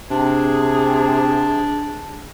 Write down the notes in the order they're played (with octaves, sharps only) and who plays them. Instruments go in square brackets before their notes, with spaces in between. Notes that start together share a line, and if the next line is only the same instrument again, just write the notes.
[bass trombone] C3 [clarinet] D4 [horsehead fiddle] G#4